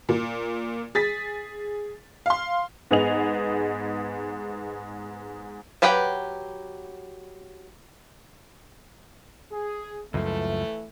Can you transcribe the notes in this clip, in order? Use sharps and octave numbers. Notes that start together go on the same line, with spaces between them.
A#2
G#4 A6 B6
F5 C6
G#2 B3 G#4 D#5 F7
F#3 G4 B4 F#5 G5
G#4
C#2 F#2 E3 F3 A3